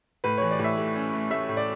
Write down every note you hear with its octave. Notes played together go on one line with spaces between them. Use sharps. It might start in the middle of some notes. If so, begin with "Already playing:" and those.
A2 B4
E3 C#5
D5
A2
E5
A3
C#4
A3
A3 E5
A2
D5